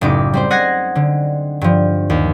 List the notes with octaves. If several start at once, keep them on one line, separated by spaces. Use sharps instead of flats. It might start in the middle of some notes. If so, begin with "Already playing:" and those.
F#1 A2 D#4 D6
G3 C4 C5
D#5 F#5 F#6 G#6 A#6 C7
D3
G2 F3
D#2